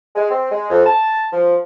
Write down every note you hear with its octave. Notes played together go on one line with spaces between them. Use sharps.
G#3
C4
G#3
F2
A5
F3